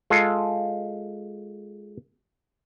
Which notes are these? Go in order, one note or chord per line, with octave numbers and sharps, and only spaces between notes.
G#3 F4 A4